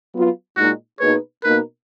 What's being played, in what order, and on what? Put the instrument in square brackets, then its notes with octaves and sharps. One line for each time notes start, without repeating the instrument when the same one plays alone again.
[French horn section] F#3 B3 F4 B4
[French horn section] A#2 G#3 D#4 [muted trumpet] F#4
[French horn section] B2 A#3 D#4 G#4 B4 [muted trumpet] C#5
[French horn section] B2 A#3 D#4 A#4 [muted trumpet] B4